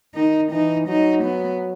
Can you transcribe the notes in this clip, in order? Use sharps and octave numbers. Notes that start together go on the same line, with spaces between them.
D#3 D#4
E3 D#4
F#3 D#4
B3